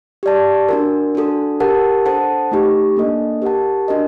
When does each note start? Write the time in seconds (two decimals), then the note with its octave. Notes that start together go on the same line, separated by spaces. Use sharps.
0.23 G4 D5 A5
0.69 D4 F#4 A#4
1.15 D4 F#4 A4
1.60 G4 A#4 F#5 A5
2.05 D4 A4 C5 F#5 A5
2.51 A3 D#4 G4
2.97 A#3 D4 A4 D#5
3.42 G4 A#4 F#5 A5
3.88 D4 F#4 A#4 D#5